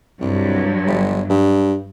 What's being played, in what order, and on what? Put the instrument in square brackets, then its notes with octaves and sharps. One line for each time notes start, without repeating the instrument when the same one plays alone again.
[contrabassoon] C2 [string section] G2 F#3
[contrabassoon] G1
G2